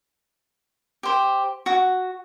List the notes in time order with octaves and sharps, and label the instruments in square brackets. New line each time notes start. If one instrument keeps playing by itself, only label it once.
[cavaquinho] G4 C5
F#4